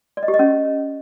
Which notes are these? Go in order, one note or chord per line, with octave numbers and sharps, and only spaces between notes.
D5
D#5
G4
D#5
C#4